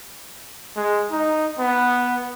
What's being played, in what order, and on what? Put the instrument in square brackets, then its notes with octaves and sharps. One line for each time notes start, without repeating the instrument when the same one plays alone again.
[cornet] G#3
D#4
B3